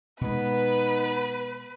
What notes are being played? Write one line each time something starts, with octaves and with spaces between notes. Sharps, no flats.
B2 G#3 B3 D#4 B4